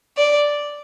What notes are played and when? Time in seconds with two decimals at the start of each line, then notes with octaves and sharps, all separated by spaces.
0.17 D5